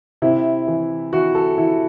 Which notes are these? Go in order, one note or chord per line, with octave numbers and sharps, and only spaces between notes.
C3 E4
E3
E3 F#4
A4
E3 E4